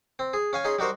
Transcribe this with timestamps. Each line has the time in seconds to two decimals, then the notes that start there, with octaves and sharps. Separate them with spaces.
0.19 C4
0.33 G#4
0.53 C#4 F5 G#5
0.64 C#4 D#4 G#4 C6
0.79 G3 D#4 F#4 A#4 C5